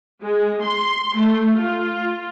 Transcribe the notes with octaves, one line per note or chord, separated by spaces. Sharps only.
G#3
C6
A3
F4